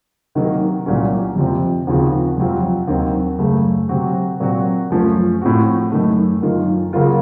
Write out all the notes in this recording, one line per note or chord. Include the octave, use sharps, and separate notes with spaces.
C3 D#3 F#3 A#3
C2 A#2 F#3 A#3 C#4
F2 C3 F3 C4
D#2 C#3 F3 C4 F#4
F2 C3 F#3 C4 F4
D#2 D#3 F#3 C4
F#2 C#3 A3
C3 F#3 C4 F#4
A#2 F#3 C4 F#4
F#2 F3 A3 C#4
A2 F3 C4 F#4
F#2 D#3 A3
F#2 D#3 A#3 F4
C#3 F#3 A#3 F4